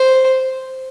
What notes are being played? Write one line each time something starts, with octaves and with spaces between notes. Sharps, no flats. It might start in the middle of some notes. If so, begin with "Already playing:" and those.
Already playing: C5